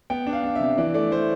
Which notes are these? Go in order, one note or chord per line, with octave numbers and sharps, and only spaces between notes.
B3 G5
D4
F5
D4
C3 E5
E3 D5
A3 D5
A3 C5